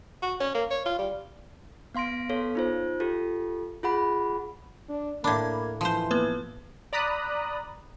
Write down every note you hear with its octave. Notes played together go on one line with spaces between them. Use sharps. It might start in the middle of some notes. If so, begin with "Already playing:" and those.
F#4
C#4
A#3
C#5
F4
G3
B3 F5 C6 A#6 D7
B3 A4 C#5 F5
D#4 F4 C5
F4 G4 A4
F4 G#4 F#5 B5
D4
A2 A#3 D4 B5 D6 G#6
E3 F3 C5 C6
A#3 B3 B4
D5 A#5 B5 D#6 F#6